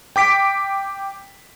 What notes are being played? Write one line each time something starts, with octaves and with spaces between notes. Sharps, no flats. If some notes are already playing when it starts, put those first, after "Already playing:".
G5 D6 B6 D7